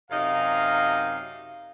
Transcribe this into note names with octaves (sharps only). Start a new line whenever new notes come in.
F#2 C3 D#4 F5